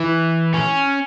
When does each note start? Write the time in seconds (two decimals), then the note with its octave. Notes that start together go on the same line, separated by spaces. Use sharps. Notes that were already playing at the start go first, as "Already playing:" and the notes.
Already playing: E3
0.54 C#4